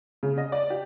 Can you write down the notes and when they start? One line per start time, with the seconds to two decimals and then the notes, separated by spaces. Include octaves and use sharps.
0.23 C#3
0.38 D#5
0.52 D5
0.70 G4